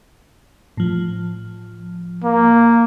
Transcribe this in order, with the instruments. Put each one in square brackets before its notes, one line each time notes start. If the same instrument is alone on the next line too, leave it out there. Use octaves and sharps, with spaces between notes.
[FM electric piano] A2 F3
[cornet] A#3